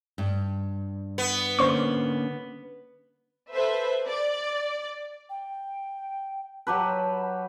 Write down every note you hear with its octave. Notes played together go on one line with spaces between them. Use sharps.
G2
B3
D3 A#3 C#4 C5 C#6
A4 B4 C5 E5
D5
G5
F#3 G4 B4 A5